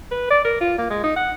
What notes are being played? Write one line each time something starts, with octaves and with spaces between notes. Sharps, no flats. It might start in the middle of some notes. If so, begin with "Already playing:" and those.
B4
D5
A#4
F4
A#3
G#3
D#4
F#5